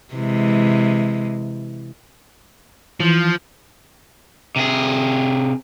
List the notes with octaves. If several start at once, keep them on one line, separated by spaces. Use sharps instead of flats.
C3 E3 G#3
E3 F3
C3 G#4